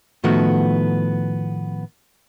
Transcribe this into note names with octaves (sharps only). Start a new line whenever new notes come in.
A2 D#3 F3 A3 B3 F#4